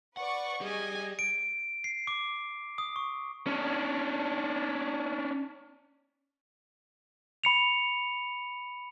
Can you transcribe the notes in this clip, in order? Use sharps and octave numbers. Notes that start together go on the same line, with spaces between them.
B4 D5 F#5 C#6
G3 G#4 D#5 G#5
D7
C7
D6
D#6
C#6
C#4 D4
B5 C#7 F7